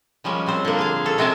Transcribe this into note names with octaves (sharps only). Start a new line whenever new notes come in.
F3 G3 G#3 C#4 A#4
A#2 C4 C5
D3 A#3
G#4 F5
C#4 A4
C3 G#3 C4 A#4 G#5 A5